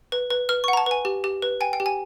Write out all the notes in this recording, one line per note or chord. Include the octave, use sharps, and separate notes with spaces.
B4
B4
B4 F6
C#6
F#5
A#5
A5
B4 G#5
G4
G4
B4
G5 G#5
G5
G4
G#5